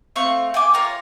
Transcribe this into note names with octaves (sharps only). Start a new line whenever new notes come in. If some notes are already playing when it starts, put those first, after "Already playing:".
A3 C4 F5 C#6
G5 G#5 D6
F4 A#4 C#5